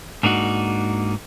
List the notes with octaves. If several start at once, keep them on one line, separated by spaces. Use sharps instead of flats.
G#2 A#3 D4 D#4 F#4